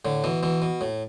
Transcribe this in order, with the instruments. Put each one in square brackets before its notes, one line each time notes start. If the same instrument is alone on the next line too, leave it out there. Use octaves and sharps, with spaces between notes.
[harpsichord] A2 D3
B2 E3
B2 E3
B2
A2